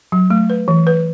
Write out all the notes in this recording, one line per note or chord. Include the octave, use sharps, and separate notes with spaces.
F#3
A3
B4
E3
B4